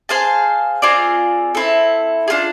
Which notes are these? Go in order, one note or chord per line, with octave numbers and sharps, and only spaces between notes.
G#4 C5 F5 A5
C4 F4 G#4 D5
C4 E4 A4
D4 F4 G#4